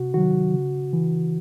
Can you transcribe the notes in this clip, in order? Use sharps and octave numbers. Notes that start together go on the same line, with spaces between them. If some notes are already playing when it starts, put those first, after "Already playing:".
Already playing: C3 F#4
D#3 F#3 F#4
C#3
E3